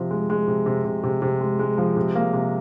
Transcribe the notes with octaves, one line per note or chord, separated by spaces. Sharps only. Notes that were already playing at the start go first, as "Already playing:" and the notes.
Already playing: C3 F3
G#3
G#3
C3
C3
C3
C3
C3
G#3
G#3
F3
C3
A#3
C3